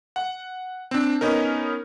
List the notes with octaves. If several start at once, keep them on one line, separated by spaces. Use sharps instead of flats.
F#5
C4 D4
B3 C#4 D#4 A#4